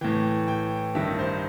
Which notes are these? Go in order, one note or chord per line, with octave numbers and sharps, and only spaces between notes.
A2 E3 G5
G5
G2 D#3 E5
C5